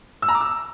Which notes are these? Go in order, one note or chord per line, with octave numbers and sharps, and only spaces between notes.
E6
A#5
D6
E6